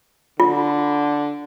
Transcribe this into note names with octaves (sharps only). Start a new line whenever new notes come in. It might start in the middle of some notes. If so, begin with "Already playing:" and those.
D3 F4